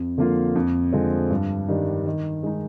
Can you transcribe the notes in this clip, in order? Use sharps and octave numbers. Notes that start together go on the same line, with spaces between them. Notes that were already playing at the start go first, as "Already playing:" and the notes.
Already playing: F2
D3 F3 A#3 F4
F2
D3 F3 G#3 C4
G2
D#3 G3 D4
D#3
G#3 D#4